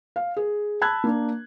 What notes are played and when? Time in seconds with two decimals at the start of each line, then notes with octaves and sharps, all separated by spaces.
0.16 F5
0.37 G#4
0.82 A5 B5 E6 F#6 G#6
1.04 A#3 D4